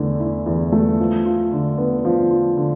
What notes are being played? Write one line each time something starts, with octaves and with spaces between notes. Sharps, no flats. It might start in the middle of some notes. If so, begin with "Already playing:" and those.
Already playing: E2 D3 A3 E4
E4
E2
A3
F3
F4
D3
B3
F3
F4
D3